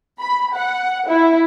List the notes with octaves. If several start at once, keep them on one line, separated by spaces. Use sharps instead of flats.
B5
F#5
E4